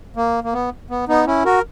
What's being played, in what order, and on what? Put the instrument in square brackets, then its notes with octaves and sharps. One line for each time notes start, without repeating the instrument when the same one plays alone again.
[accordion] A#3
A#3
B3
B3
B3 D#4
C#4 E4
F#4 A#4